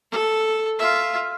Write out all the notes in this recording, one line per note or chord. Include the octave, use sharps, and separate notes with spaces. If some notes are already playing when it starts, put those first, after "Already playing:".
A4
F4 E5